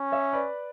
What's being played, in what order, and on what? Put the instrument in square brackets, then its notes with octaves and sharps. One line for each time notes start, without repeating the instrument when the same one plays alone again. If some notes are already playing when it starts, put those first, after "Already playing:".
Already playing: [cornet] C#4
[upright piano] C#5 E5
B4 D5